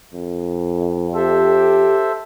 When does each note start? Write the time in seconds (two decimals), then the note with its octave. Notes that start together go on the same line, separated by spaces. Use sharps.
0.13 F2
1.15 G4 A4 C5 E5